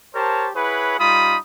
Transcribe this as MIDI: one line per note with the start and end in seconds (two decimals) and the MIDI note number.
0.15 0.49 67
0.15 0.49 70
0.15 0.49 72
0.15 0.49 73
0.15 0.49 81
0.55 0.97 64
0.55 0.97 68
0.55 0.97 71
0.55 0.97 73
0.55 0.97 78
0.55 0.97 83
1.00 1.38 55
1.00 1.38 63
1.00 1.38 65
1.00 1.38 83
1.00 1.38 87